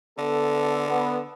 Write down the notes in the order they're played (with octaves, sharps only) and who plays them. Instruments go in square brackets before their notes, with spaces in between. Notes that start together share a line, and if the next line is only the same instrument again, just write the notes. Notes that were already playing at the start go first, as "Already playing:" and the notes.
[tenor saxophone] D3 [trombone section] B3 A4
[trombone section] B3